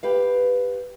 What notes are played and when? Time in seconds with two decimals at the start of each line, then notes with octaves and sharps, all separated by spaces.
0.03 G4 B4 F5